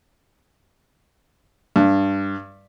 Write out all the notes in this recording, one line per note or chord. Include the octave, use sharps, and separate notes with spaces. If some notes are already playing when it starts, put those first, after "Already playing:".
G2